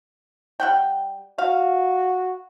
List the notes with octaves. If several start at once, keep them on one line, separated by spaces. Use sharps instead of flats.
G3 F#5 G5
F#4 F5